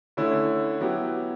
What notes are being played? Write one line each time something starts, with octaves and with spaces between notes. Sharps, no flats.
D3 A3 C#4 E4
F#3 B3 E4 G4